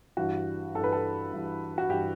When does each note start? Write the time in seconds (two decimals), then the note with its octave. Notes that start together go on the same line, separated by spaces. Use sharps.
0.17 G2 E3 F#4
0.74 G2 E3 A4
0.84 B4
0.92 A4
1.32 G2 E3
1.78 F#4
1.89 G2 E3 G4